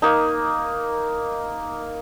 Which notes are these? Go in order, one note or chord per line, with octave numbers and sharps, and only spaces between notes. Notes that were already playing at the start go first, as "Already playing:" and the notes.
A#3 D#4